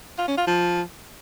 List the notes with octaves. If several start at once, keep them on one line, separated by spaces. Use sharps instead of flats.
F4
C#4
F4
F3